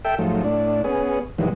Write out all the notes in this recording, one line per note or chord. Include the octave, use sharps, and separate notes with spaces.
A4 E5 G5
G#2 F3 F#3 A3
A2 D4
B3 C#4 G#4
G2 B2 D#3 E3 F#3 G#3